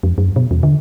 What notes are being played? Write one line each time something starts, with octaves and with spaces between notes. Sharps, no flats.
F2
F#2
B2
E2
D3